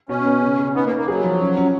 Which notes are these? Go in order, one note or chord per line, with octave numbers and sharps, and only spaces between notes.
B2 C#4
B3
C#3
C#3
B3 D#4
A#3
D#4
A#3
F#3 G#4
F3
C#4
C#4